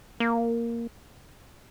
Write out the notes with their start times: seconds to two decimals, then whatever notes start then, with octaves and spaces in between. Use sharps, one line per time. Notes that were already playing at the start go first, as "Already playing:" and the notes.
0.20 A#3